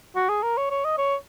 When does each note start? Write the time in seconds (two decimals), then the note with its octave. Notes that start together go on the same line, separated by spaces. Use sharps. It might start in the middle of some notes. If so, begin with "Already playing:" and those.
0.16 F#4
0.29 G#4
0.43 A#4
0.58 C#5
0.71 C#5
0.85 D#5
0.98 C#5